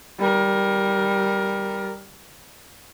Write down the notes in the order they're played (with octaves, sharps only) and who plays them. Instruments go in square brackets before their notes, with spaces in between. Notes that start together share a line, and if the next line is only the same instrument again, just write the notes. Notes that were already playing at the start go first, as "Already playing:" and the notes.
[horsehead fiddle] G3 A#4